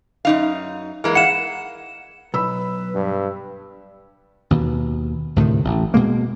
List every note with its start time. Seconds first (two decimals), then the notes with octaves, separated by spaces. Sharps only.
0.25 F#2 D#4 F5
1.04 E3 G#3 A#3 A#4
1.15 F5 F#5 C#7 E7
2.34 B1 B4 B5 E6
2.95 G2
4.51 D#2 B2
5.36 D2 A2 C3 D#3
5.64 A1
5.94 B2 G#3 A#3